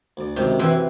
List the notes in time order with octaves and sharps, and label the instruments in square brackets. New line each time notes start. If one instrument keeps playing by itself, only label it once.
[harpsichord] D2 D5
[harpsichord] C#2 F#2 D#3 [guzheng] C3
[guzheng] C3 E3 C4 [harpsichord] F#3